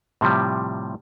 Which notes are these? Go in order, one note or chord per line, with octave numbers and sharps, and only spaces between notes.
A2 C3 F3 G3